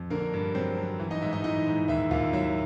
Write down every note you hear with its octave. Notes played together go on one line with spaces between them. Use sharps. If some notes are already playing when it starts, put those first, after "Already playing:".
Already playing: F2
D3 A#3 A#4
G2
F#3 C4 C5
F#3
E3
D#4 D#5
G#2 E4 E5
D#4 D#5
E3 D#4 D#5
G#2
D#2 E4 E5
D#2 F4 F5
F#3 E4 E5